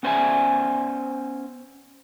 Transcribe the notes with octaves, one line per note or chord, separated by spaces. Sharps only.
B3 C#4 C5 D5 E5 G#5